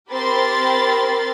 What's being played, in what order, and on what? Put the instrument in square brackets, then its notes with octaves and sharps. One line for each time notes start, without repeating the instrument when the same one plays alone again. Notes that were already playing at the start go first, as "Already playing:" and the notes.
[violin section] C4 G4 A#4 B5 C6 A6